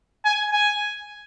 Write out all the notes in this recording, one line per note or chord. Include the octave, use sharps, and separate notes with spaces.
G#5
G#5